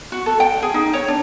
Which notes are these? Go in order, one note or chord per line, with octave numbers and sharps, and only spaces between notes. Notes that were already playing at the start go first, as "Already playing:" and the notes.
F#4
A4
G5
G#4
D#4
C#5
D4